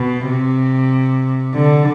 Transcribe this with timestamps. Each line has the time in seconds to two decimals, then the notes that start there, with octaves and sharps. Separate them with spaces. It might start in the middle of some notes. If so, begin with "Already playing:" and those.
Already playing: B2
0.27 C3
1.54 D3